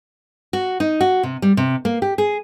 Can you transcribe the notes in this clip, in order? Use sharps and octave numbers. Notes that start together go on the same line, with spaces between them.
F#4
D#4
F#4
C3
G3
C3
A#3
G4
G#4